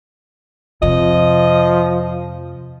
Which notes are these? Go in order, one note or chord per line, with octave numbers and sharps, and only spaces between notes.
F2 C3 F3 D#5